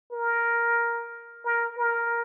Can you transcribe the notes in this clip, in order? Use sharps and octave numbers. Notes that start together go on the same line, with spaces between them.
A#4
A#4
A#4